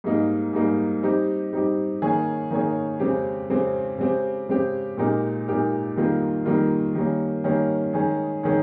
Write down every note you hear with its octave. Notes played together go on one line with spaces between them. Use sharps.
G#2 G3 A#3 D#4
G#2 G3 A#3 D#4
G3 C4 D#4 G4
G3 C4 D#4 G4
D#3 A#3 C#4 G#4 C#5
D#3 A#3 C#4 G#4 C#5
F2 C#3 G#3 C4 G4
F2 C#3 G#3 C4 G4
C#3 G#3 C4 G4
C#3 G#3 C4 G4
A#2 G#3 D#4 G4 A#4
A#2 G#3 D#4 G4 A#4
F2 D#3 G3 A#3 F4
F2 D#3 G3 A#3 F4
D#3 G3 A#3 C#4
D#3 G3 A#3 C#4
D#3 G#3 C#4 G#4
D#3 G#3 C#4 G#4